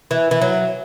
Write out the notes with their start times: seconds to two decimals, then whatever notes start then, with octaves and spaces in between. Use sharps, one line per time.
0.11 E3
0.31 E3
0.41 F#3